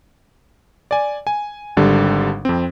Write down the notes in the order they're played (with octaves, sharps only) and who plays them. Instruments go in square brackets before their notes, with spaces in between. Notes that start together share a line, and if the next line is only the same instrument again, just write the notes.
[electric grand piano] D5 G#5
G#5
G#1 D3 G3
F2 C4